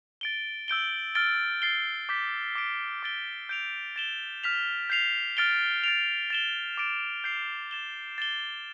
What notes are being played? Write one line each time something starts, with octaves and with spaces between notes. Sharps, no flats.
A6 D7 G7
E6 G6 D7 G7
F6 A6 D7 G7
A6 C7 G7
D6 G6 B6
D6 A6 D7
D6 A6 D7 G7
G6 D7 F7
A6 E7 G7
F6 B6 F7
G6 C7 F7
F6 A6 D7 G7
A6 D7 F7
A6 E7 G7
D6 A6 D7
G6 C7 F7
A6 E7 G7
A6 E7 G7